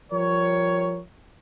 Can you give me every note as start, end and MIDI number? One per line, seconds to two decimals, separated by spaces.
0.12 1.00 53
0.12 1.00 55
0.12 1.00 70
0.12 1.00 73